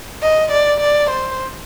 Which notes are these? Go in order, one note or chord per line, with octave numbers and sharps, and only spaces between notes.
D#5
D5
D5
C5